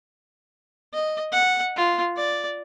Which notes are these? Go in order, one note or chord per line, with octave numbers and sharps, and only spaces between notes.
D#5
F#5
F4
D5